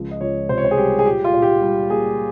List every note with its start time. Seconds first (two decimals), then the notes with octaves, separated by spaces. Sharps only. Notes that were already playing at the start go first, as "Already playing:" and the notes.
Already playing: C#2 F3
0.11 D#5
0.21 C#2 C#5
0.49 C3 C5
0.58 C#5
0.65 C5
0.71 G#4
0.77 G3 G4
0.99 G#4
1.06 A#2 G4
1.24 F4
1.34 A#2
1.42 G4
1.61 G3
1.90 A#3 G#4